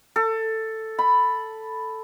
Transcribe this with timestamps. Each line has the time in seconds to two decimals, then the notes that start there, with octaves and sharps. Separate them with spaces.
0.16 A4
0.99 B5